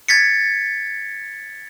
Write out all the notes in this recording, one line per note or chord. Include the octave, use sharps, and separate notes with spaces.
G#6 A6 B6 C#7